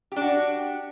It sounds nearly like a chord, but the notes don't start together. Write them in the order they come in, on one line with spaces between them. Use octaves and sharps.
G4 D4 F#4